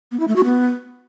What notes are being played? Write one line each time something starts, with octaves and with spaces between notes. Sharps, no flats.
B3
E4
A3
F#4
B3